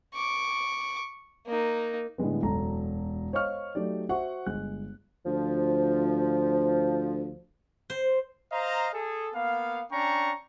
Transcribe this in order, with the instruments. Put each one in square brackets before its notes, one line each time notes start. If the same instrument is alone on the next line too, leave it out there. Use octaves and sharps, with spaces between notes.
[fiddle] C#6 D6
A#3 D#4
[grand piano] A2 D3 G3 G#3 B3
E1 F#2 A4 A#5
C5 C#5 D#5 F5 C#6 F6
F#3 A3 D#4 G4 D5
F#4 C5 E5 F#5 C#6
G1 G#3 F#6
[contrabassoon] D2 [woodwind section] F3
[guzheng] C5
[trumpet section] C5 D#5 F5 A#5
G#4 A4
A#3 B3 F5
C#4 D4 G5 A#5 C#6